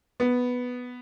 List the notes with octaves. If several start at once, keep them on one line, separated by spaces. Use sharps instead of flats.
B3